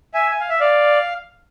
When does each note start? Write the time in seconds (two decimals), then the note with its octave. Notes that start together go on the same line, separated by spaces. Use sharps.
0.14 E5 G#5
0.31 G#5
0.40 F5
0.49 E5
0.60 D5 F5